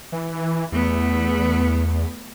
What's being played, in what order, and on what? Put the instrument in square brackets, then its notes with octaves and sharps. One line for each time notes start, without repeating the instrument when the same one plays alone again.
[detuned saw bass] E3
[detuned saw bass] E2 [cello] A3 B3